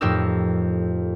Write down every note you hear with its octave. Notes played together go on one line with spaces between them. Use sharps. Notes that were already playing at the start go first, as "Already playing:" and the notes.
F2 A2 D#4 G4 A#4 E6